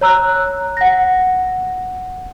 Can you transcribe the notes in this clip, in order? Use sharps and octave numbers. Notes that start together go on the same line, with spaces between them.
C#5 A#5 E6 F#6
F#5 A#6